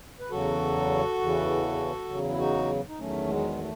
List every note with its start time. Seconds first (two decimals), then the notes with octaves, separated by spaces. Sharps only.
0.20 B4
0.31 E2 C#3 F#3 F#4 A4
1.20 E2 C#3 E3
2.10 E2 C#3 F#3
2.31 E4
2.39 D#4 F#4
2.89 D#4
2.99 E2 D#3 F#3 A3 C#4
3.28 G#3 B3
3.59 A3